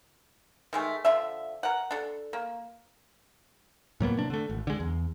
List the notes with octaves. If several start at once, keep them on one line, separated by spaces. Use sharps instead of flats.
D#3 G#3 A3
D3 F3 E5
A#4 F#5
D4 A4
A#3
A2 F#3 A#3 B3
C3 D4
D3 A3
G#1
D3 G#3
E2